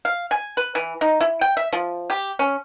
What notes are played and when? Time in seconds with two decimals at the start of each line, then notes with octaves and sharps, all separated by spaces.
0.05 F5
0.31 G#5
0.57 B4
0.75 E3
1.01 D#4
1.21 E4
1.41 G5
1.57 E5
1.73 F3
2.10 G4
2.39 C#4